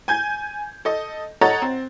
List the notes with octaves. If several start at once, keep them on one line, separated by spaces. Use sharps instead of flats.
G#5 G6 G#6
A4 D#5
A4 C#5 D#5 F#5 A#5 A6
C4